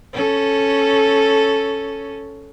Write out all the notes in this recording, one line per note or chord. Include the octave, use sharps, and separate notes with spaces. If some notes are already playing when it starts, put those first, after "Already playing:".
C#4 A4